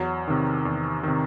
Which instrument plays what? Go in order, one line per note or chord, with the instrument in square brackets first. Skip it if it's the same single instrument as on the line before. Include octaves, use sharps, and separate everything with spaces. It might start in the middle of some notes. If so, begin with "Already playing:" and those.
Already playing: [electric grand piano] E2 [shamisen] F#3
[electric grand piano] C3 D#3
E2
C3 D#3